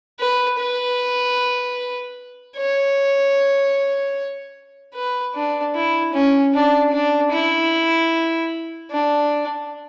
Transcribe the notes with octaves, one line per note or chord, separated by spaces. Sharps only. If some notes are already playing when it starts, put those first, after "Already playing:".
B4
B4
C#5
B4
D4
E4
C#4
D4
D4
E4
D4